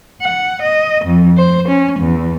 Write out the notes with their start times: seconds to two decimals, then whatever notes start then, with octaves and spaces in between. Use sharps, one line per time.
0.22 F#5
0.62 D#5
1.05 F2
1.38 C5
1.68 C#4
2.00 E2